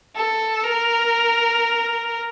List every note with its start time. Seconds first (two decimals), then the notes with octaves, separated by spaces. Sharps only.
0.16 A4
0.64 A#4